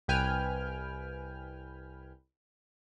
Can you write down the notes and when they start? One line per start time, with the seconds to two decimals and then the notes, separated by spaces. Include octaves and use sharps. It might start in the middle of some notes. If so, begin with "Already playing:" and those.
0.08 C2 B4 G5 G#5 F6